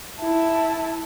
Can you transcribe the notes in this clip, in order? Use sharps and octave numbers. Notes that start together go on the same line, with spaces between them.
E4 A5